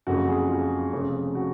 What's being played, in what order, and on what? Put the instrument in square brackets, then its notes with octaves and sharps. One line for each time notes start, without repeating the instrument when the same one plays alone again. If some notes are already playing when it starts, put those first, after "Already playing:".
[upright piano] F#1 F2 C#3 F#4
G#4
F4
F1 F2 C#3
F#4